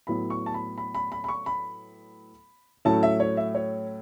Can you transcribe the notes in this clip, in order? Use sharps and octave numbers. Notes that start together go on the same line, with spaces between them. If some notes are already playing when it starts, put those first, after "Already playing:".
A2 F#3 B3 E4 B5
C#6
A5
B5
B5
B5
B5
B5
C#6
B5
A2 F#3 A3 C#4 E4 A5
E5
C#5
E5
C#5